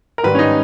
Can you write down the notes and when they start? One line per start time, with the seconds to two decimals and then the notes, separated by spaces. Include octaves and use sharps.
0.18 A#4
0.23 G#2 D#3 G3 B4
0.35 C#4
0.39 D#4